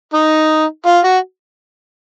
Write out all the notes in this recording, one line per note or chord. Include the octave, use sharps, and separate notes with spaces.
D#4
F4
F#4